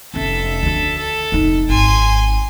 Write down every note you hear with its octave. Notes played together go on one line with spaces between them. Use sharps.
F1 C#4 A4 E5
D2 D3
A4
F1 D#4
G#1 G#5 C6